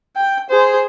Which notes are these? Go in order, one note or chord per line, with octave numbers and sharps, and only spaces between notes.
G5
G#4 C5